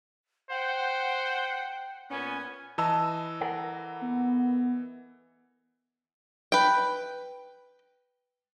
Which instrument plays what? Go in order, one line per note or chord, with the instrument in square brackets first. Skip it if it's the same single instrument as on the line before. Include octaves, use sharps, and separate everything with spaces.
[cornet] C5 [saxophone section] F#5 [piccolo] G5
[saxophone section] A#2 C#4 [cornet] B3 [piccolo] G#5
[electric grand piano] E3 D#5 E6 [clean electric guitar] A5
[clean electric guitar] A4 A#4 F#5
[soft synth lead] B3
[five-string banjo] B4 G5